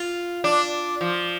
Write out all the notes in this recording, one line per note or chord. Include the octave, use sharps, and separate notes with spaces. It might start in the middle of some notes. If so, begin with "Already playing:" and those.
Already playing: F4
D4
F3